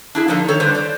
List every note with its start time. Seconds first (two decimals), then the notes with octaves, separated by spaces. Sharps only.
0.15 D4 E4 G#4
0.28 D3 F3 A#3 D4 D#4 A4
0.48 D#3 A4 C#5
0.60 D3 G3 D4 B4 C5
0.75 C5 D5